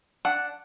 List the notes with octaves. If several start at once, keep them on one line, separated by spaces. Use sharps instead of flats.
D4 F#5